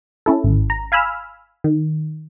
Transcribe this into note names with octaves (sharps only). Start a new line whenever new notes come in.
C#4 E4 A4
G#1
A#5
F5 G#5 B5 E6 F6
D#3